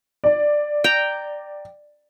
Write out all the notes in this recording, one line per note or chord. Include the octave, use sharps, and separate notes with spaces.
D5
G5 A#5